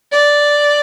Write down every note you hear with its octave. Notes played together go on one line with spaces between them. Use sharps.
D5